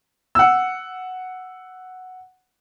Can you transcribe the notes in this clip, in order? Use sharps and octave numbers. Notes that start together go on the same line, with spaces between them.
F#5 E6